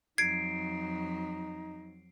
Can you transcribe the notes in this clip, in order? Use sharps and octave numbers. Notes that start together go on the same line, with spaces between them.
F2 F#3 D#4 G#6 C7 D7